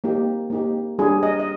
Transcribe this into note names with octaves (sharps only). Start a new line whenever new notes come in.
A#3 D#4 G4
A#3 D#4 G4
G3 D4 G4 G#4
D#5
D#5